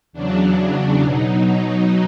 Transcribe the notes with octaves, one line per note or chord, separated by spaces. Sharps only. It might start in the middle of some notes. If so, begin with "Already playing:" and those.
E2 C#3 F#3 D4
B2 F#3 D#4
D#4